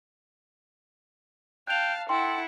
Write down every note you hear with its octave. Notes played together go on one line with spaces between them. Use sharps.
F5 G5 A5 F#6 F7
E4 A4 F#5 G5 C6